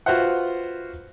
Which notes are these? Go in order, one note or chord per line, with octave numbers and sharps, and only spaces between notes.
F4 F#4 B4 C5 E5 F#5